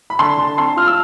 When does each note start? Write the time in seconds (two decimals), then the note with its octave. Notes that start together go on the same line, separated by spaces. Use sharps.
0.10 B5
0.19 D3 A5 C6
0.38 D3
0.57 C4 A5 C6
0.76 F4 F6
0.87 E6